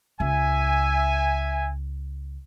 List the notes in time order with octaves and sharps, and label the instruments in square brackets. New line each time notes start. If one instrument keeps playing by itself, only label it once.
[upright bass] C#2 [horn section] E5 G#5